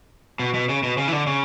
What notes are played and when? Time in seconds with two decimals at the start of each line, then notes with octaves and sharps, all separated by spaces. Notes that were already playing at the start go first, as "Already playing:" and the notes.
0.39 B2
0.54 B2
0.69 C#3
0.83 B2
0.98 C#3
1.08 E3
1.13 D3
1.27 C#3